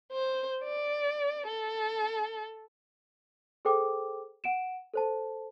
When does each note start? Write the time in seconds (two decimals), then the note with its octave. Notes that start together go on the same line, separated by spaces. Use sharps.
0.12 C5
0.64 D5
1.47 A4
3.65 G#4 A4 C5 G5 D6
4.44 F#5 D7 E7
4.94 A4 C5 A5